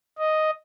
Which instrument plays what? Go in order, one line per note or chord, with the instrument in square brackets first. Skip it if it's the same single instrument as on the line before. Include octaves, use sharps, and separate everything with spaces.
[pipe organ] D#5